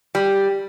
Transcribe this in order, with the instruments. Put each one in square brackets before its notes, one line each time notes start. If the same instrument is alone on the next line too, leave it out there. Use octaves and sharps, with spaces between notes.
[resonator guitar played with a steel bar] G3